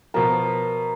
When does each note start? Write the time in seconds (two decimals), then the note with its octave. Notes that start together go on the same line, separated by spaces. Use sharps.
0.14 B2 F3 A#4